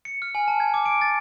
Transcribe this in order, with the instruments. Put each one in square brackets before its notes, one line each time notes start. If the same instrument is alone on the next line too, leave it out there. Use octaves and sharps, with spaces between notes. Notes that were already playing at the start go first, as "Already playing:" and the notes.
[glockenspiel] C#7
F6
G#5
A5
G#6
D6
D7
A6